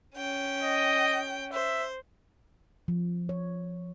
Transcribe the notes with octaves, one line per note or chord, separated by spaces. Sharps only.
C#4 G5
D#5
C5 E5
F3
C#5